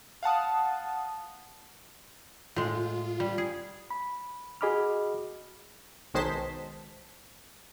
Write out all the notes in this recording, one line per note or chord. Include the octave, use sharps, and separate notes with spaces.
F5 F#5 A5 D#6
A2 G#3 F4
G3
G#4
B5
F#4 G#4 D#5 B5 D6 F6
B1 D#3 G#3 C5 A5 B6